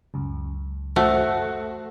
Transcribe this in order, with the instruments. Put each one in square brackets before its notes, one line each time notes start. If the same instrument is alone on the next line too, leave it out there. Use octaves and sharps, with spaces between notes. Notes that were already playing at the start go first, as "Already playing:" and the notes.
[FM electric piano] C#2 F#2
[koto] A3 [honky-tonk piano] F#4 [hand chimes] A4 C5 F#5